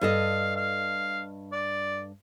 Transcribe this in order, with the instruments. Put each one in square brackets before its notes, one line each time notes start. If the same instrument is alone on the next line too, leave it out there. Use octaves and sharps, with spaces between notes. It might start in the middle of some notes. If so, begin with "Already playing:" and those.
[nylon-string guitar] G2 A4 D#5 [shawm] F5
[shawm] F5
D5